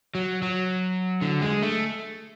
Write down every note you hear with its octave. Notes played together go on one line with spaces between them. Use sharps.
F#3
F#3
D3
G#3
A3